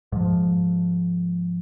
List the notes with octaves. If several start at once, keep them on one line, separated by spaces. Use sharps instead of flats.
G#2 F3